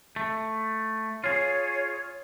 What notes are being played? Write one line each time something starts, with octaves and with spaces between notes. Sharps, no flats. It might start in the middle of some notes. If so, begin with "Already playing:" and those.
A3
F4 G#4 C#5